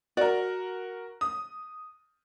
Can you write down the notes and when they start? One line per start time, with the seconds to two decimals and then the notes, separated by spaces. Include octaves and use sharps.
0.17 F#4 A#4 D5
1.21 D#6